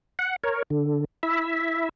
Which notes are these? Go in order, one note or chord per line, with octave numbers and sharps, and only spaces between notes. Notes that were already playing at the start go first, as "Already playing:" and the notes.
F#5
A#4 C#5
D3
E4 E5